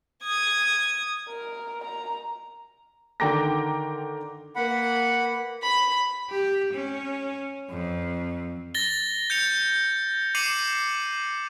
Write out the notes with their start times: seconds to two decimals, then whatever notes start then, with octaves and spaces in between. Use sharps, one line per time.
0.24 D#6 G#6
1.29 A#4
1.84 A#5
3.20 D3 D#3 G5 A#5 D6 A#6
4.56 A#3 B4 F#5 B5
5.63 B5
6.30 G4
6.73 C#4
7.70 F2
8.75 A6 A#6 G7
9.30 G6 C#7 F7
10.35 D6 C7 C#7 D#7 F7 F#7